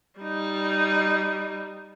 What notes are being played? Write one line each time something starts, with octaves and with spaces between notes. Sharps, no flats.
G3 D#4